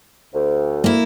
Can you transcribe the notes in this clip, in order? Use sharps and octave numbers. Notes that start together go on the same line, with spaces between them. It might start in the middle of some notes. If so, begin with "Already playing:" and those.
D2
A#3 E4